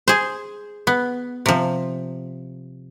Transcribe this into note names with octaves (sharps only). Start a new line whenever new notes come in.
G#4 C5
B3
C3 F3